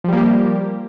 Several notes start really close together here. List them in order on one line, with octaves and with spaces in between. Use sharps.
F3 G3 A#3 G4